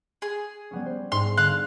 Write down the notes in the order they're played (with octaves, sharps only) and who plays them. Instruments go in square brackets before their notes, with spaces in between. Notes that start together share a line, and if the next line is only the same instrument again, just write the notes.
[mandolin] G#4
[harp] G3 B3 C#4
C5
[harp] G#2 [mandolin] C6
[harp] D3 [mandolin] F5 C6 F#6